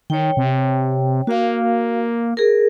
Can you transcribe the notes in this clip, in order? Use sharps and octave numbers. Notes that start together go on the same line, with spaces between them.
D#3 C#5 G5
C3
A#3 F#4 F5
G#4 A#4